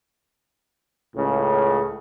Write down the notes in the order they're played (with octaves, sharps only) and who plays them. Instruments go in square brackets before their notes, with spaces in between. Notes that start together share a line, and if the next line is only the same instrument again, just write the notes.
[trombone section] C#2 A2 C#3